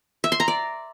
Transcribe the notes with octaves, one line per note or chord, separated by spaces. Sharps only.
E5
C6
A#5
D5